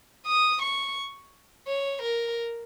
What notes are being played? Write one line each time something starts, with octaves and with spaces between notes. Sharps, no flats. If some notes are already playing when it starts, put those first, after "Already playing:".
D#6
C#6
C#5
A#4